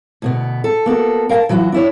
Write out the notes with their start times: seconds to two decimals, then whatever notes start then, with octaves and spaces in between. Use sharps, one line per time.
0.22 D2 B2 B3
0.64 A4
0.86 A#3 B3 F#4 A4
1.29 A#4 F5 G5 A5
1.49 E3 F#3 F4 F#4
1.72 D4 E4 C#5